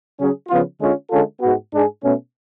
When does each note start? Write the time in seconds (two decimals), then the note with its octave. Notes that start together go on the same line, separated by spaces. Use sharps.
0.17 C#3 F#3 C#4 G#4
0.48 C#3 F3 B3 F4
0.79 D3 G#3 C#4 F4
1.10 D3 G#3 C#4 F4 A4
1.41 G#2 G#3 B3 F#4
1.72 G#2 G#3 D4 G#4
2.02 B2 A3 C#4